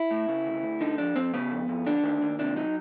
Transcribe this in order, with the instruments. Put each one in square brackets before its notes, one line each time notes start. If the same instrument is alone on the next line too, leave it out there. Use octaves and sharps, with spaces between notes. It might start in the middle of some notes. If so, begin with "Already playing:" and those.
Already playing: [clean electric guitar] E4
A2
C#3
D2
D2
D3 D#4
F2 D4
F2 C4
C#3 B3
F2
F2
D3 D4
D#2
D#2
C3 D4
F#3 D#4